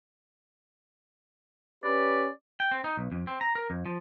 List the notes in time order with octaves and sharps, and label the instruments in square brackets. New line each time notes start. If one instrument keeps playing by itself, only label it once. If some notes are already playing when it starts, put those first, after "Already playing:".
[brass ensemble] C#4 G4 B4 [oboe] D5
[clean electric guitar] G5
C4
D#4
B1
F2
C4
A#5
A#4
F2
F3